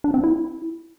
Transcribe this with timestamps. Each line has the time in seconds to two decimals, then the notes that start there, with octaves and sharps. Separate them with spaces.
0.04 D4
0.14 C4
0.24 E4